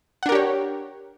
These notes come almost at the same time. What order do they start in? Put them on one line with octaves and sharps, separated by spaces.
F#5 D4 A#4 G4 C#5